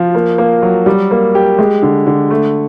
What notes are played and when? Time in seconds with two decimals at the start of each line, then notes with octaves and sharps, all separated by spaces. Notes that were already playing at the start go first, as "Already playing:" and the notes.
Already playing: F3
0.15 A#3
0.38 A#3
0.63 F#3
0.86 G3
1.11 A#3
1.35 G4
1.59 G#3
1.82 D3
2.06 D3
2.30 A3